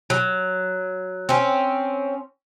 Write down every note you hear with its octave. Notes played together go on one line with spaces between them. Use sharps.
F#3
C4 C#4